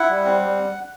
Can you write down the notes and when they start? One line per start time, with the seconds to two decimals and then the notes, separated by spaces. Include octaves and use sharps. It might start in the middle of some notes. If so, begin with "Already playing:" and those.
Already playing: E4 F#5
0.09 G3
0.25 C4
0.42 G3